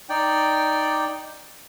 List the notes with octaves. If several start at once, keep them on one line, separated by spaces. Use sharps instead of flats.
D#4 D5 G5